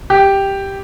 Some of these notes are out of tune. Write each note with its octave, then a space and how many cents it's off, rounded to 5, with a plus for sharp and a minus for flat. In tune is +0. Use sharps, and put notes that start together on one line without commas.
G4 +0